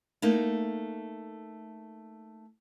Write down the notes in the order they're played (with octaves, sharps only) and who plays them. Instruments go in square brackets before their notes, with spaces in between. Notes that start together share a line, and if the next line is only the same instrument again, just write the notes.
[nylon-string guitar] A3 A#3 D#4